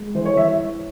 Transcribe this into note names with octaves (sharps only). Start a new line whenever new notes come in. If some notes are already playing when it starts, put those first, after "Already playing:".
Already playing: G#3
E3 C5
C#5
E3 E5